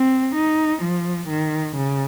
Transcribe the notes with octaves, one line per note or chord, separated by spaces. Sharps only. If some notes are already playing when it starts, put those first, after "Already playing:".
Already playing: C4
D#4
F3
D#3
C#3